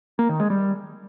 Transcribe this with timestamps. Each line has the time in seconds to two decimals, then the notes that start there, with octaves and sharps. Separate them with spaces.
0.19 A#3
0.29 D#3
0.40 G#3
0.50 G3